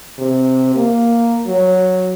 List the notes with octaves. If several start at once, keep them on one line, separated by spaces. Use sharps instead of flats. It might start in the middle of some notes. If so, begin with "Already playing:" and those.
C3
A#3
F#3